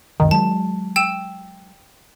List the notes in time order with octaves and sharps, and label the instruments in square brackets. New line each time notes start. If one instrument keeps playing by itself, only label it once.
[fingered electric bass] C#2 F#2 C3 [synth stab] D#3
[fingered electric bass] F#3 G#3 [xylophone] A5
[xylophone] G5 E6 E7